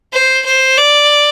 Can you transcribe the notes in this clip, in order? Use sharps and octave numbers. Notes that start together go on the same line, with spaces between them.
C5
C5
D5